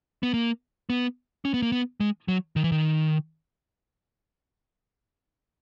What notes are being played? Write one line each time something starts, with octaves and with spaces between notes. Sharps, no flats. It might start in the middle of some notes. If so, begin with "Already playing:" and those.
B3
A#3
B3
C#4
B3
A#3
B3
G#3
F#3
D#3
E3
D#3